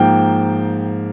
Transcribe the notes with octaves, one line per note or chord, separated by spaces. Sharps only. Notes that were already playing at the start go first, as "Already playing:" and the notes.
Already playing: G#2 F3 A#3 G5